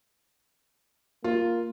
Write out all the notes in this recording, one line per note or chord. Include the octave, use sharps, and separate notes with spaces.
A#3 F4